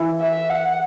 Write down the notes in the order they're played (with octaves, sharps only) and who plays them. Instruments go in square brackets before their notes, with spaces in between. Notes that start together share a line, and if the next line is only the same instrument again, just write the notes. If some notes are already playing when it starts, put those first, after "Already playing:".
Already playing: [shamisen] E3
[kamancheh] E5
F#5